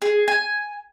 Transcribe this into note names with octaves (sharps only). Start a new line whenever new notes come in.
G#4
G#5